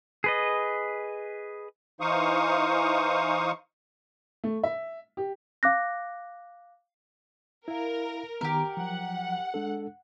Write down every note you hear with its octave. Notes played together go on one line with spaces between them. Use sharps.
G#4 B4 D#5
E3 D#4 C5 F5 C#6 D#6
A3
E5
G4
F5 D6 F#6 A#6
E4 A#4 F5
D#3 B3 G4 A#4
F3 F#3 F#5
G#3 D4 A4